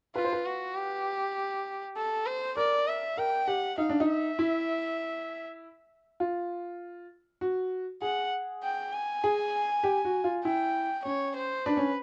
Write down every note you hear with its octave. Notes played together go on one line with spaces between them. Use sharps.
F4 B4
C5
B4
F#4
G4
A4
C5
A#4 D5
E5
A#4 G5
G4 F#5
D#4 F5
D4
D#4
E5
E4
F4
F#4
G#4 F#5
G5
G#5
G#4
G4
F#4
F4
E4 G5
C#4 C#5
C5
D4 B4
C#4